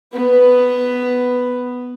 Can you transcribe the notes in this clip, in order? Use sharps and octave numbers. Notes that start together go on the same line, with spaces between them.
B3 B4